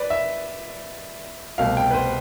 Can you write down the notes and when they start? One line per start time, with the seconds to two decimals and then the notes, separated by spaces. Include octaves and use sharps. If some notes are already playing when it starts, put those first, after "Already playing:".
Already playing: B4 D5
0.10 E5
1.58 C2 B2 A3 C4 F5
1.77 G5
1.91 B4
1.94 C5